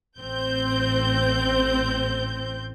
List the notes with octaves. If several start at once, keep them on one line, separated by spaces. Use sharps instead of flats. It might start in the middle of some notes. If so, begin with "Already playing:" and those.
A1 C4 G6